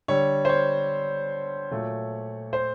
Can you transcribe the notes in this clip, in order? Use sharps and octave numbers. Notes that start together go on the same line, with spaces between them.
D3 G3 C#5
C5
C#5
A#2 F#3 A3
C5